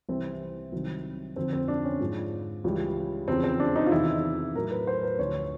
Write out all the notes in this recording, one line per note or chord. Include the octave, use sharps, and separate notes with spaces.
C2 C3 E3 C4
C2 C3 D#3 F#3
F2 D3 F3 C4
C4
D4
C#4
G#2 F3
C#2 C#3 E3 G3
E2 C#3 F3 C4
C4
D4
D#4
F4
E2 C3 D#3 E4
A2 F#3 A#4
B4
C5
B4
D2 D3 F3 C#5